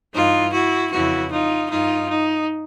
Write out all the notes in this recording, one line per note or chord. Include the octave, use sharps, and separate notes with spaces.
G2 E3 D#4 F4
E4 F#4
F2 C#3 E3 E4 F#4
D#4 F4
G2 D#3 D#4 F4
D#4